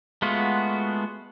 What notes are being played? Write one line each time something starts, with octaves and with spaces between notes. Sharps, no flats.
G#3 A3 B3 F4 F#4